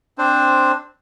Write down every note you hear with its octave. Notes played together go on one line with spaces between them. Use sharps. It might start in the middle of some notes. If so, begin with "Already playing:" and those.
C4 D4 C5